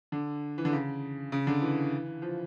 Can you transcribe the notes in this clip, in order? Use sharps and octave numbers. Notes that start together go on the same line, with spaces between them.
D3
E3
D3
C#3
C#3
D3
E3
F3